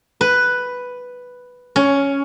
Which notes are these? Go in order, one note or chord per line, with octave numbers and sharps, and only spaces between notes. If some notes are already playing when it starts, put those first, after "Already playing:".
B4
C#4